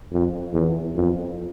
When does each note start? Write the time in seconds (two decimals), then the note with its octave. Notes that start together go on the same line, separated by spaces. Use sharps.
0.12 F2
0.53 E2
0.96 F2